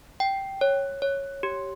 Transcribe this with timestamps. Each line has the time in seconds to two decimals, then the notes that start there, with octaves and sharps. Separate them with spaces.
0.20 G5
0.61 C#5
1.02 C#5
1.43 G4